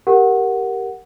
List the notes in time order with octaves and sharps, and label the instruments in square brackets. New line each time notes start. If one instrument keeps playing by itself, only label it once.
[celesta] G4 A#4 F#5